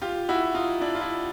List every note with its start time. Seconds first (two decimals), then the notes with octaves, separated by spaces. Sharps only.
0.02 F4 G4
0.29 E4 F#4
0.54 D#4 F4
0.81 D4 E4
0.95 F4
1.01 D4 E4